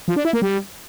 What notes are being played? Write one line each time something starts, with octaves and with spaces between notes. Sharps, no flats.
F3
D4
E4
A#3
G3